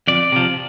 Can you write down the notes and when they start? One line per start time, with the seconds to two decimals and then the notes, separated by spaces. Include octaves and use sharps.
0.08 F2 D5
0.32 C3 F3